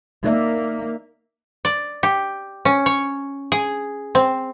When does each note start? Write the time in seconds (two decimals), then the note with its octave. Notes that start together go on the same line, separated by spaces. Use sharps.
0.24 A#3 D#4 D5 E5
1.65 D5
2.03 G4
2.65 C#4
2.86 C#5
3.52 G#4
4.15 C4